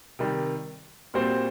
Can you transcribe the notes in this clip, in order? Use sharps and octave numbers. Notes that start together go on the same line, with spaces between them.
C3 D#3 G3
A#2 G3 C4 F#4 C5